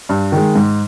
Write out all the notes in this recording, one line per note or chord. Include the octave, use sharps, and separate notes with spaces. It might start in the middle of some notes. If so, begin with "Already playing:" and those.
G2
D#3 G#3
G#2